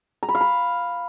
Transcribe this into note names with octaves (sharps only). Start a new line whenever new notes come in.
A#5
B5
F5
B5